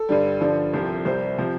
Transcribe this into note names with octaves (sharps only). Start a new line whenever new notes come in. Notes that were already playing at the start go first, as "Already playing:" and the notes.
Already playing: A4
G2 D3 G3
G2 D3 F3
C2 C3 F3
C2 C3 G3 C5
C3 F3